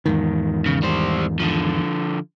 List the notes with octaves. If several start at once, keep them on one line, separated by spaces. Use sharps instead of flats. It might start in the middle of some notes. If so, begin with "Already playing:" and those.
E2 G#2 D#3
C#3
G3 C5
D3 F3